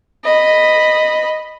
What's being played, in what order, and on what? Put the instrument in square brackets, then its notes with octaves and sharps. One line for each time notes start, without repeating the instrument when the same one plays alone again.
[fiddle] D#5 B5